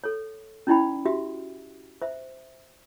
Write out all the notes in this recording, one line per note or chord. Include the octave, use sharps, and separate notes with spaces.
A4 C#5
C#4 D#4 E4 D5 G5 B5
F#4 G4 E5
C5 E5